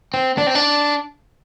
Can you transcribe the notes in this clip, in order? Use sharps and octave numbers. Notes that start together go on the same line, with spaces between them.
C4
D4
C4
D4